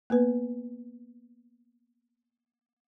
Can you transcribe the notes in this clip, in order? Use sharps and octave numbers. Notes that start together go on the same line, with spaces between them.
A#3 B3 B4